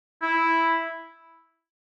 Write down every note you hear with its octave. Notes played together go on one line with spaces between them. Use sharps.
E4